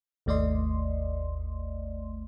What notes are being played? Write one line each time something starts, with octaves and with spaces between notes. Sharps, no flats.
G#1 D#2 A3 D5 D#5 C6